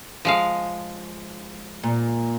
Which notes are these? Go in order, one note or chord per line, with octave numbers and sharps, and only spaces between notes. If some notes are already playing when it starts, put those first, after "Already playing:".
F3 G#3 F5
A#2